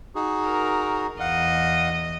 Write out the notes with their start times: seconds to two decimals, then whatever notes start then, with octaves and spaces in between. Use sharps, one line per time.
0.15 D#4 F#4 G#4
0.45 A#4
1.20 E2 D#5 F5 F#5